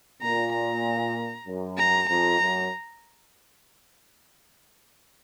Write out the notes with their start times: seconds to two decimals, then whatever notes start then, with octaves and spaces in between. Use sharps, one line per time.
0.22 A#2 A#5
0.53 A#5
1.47 F#2
1.77 A#5
2.09 F2 A#5
2.40 F#2